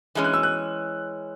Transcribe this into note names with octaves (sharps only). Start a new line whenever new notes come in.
E3 G#3 C#4
F#6
E6
F#6